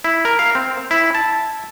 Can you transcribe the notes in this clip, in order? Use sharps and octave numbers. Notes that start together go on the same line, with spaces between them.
E4
A#4
F5
C4
E4
A5